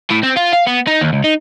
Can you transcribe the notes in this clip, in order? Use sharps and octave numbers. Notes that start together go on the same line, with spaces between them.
A2
C4
F4
F5
B3
D#4
D#2
C#2
D#4